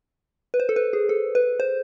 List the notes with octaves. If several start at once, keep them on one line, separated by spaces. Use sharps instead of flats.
B4
C5
A4
B4
G#4
A4
B4
C5